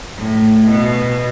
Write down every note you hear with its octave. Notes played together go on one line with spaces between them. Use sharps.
A2
B2